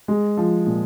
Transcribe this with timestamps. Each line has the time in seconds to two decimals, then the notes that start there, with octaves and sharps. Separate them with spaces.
0.08 G#3
0.37 F3
0.67 A#2